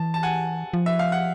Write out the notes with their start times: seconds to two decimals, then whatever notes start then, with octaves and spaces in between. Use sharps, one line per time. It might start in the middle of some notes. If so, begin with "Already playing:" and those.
Already playing: E3 A5
0.14 A5
0.23 F#5 G#5
0.73 F3
0.86 E5
0.99 F5
1.12 F#5